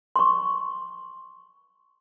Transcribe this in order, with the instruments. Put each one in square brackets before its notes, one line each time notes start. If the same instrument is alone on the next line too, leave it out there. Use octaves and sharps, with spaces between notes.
[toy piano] C6 C#6